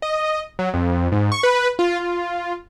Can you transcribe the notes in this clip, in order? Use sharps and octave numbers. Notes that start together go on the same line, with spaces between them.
D#5
F#3
F2
G#2
C#6
B4
F4
F4